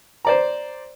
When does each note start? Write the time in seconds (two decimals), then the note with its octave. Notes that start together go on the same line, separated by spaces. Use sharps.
0.25 C5 D5 A#5